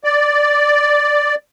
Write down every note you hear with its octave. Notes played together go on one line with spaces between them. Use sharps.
D5